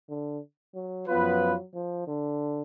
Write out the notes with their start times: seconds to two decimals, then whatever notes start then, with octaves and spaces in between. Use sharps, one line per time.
0.09 D3
0.75 F#3
1.08 F#2 F3 F#3 B3 F4 B4
1.73 F3
2.07 D3